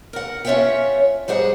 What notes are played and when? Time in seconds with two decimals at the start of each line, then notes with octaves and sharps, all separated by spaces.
0.13 A#4 F#5
0.45 C#4 F4 C#5 E5 F#5 G5
1.28 G#2 G3 G#4 C5 F#5